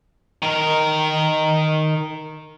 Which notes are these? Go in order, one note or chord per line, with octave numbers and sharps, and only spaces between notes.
D#3 A#4